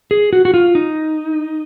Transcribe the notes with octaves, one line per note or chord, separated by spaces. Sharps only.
G#4
F#4
F#4
F4
D#4